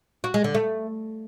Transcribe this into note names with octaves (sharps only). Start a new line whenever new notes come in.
F#4
G#3
D3
A3